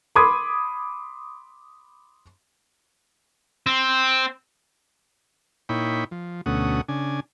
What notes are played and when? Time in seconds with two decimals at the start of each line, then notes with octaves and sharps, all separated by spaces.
0.16 B5 C6 D6 D#6 G#6
3.67 C4
5.69 A#2 D#4 E4 C#5 G5 B5
6.11 F3
6.46 D2 B2 A3 C#4 F#5 D#6
6.89 C#3 D4 G#5